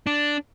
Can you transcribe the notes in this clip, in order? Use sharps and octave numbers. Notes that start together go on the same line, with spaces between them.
D4